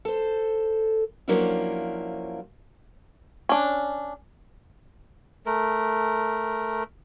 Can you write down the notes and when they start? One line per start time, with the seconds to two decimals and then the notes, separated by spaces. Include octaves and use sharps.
0.05 A4 C5
1.28 F3 F#3 A#3 C#4 D4 E4
3.49 C#4 D4
5.46 A3 A#4